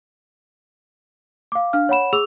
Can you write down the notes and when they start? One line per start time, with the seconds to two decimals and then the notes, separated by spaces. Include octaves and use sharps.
1.52 F5 D6
1.73 D4 F5 F6
1.89 C#5 F#5 B5 E7
2.13 G#4 D6 E6 F7